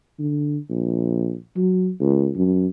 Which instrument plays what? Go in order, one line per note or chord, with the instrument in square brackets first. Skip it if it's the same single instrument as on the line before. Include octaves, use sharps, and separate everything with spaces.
[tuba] D3
A#1
F#3
C#2
F#2